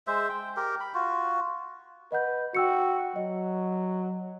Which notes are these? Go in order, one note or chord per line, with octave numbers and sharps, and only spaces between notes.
G#3 C5 E5
G5
G4 A#4
B5
F4 F#4
B4 D#5 F#5 G6
F#4 G5 E6 C#7
F#3 D#5